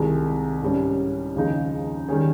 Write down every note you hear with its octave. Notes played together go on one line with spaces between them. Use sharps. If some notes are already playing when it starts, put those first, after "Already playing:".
Already playing: C2 C3 D#3 G#3
G#2 G3 C#4
D#2 C#3 F3 G#3 D#4
D#3 G3 C#4 G#4